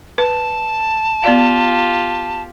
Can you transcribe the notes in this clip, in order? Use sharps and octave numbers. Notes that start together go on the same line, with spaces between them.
B4 A5
B3 F4 G4 D5 F5